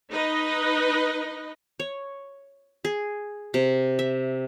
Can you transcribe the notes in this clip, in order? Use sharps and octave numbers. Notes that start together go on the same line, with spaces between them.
D#4 B4 D#5
C#5
G#4
C3
E5